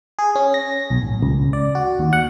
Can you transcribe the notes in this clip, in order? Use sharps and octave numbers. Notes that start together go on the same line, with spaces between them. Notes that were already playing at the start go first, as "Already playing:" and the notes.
G#4
C#4
A#6
B1
A1
C#2
D5
F#4
D#2
F#5